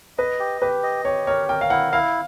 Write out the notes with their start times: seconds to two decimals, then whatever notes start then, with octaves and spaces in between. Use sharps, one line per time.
0.18 B4 D#5
0.39 G4
0.61 G4 B4
0.83 D#5
1.05 G4 C#5
1.27 A#4 C#5
1.49 A#4 G5
1.61 F5
1.70 E4 F#5
1.93 E4 F5